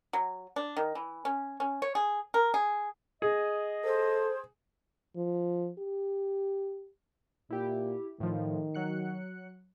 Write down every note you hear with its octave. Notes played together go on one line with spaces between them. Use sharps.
F#3
D4
D#3
E3
C#4
C#4
C#5
G#4
A#4
G#4
G#4 D#5
A4 C5
F3
G4
A#2 E4 G4
A2 D#3 F3
F#3 F#6 C#7